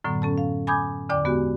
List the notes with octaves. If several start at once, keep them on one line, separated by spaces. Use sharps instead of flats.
F#2 A2 D3 F#3 B3
C#4 A4 A5
F5
G#5 B5 D6 D#6 G6 G#6
E2 D3 D5 G5 D6
G#3 B3 F#4 G4